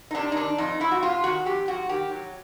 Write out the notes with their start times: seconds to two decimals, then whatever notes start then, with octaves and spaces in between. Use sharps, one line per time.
0.11 D#4
0.15 C3 D4
0.32 D#4
0.37 D#3 D4
0.58 F2 D#4
0.80 F2 E4
0.92 F#4
1.02 C3 F4
1.24 D#3 F#4
1.46 F2 G4
1.68 F2 F#4
1.89 D#3 G4
2.11 F#3